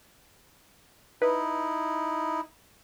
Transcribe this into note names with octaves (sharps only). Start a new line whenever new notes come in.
D#4 E4 B4